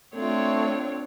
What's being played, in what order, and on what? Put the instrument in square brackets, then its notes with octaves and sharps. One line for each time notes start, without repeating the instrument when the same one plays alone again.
[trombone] A3 [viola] C4 C#5 [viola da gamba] D4 F4